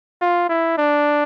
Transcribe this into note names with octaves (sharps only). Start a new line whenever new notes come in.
F4
E4
D4